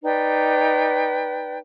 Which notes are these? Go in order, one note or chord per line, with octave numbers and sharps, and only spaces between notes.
D#4 B4 D5 G5